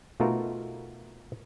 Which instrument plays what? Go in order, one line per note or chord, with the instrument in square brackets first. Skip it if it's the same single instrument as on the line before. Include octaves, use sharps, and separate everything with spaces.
[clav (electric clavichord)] B2 A3 D#4 F4 F#4 A#4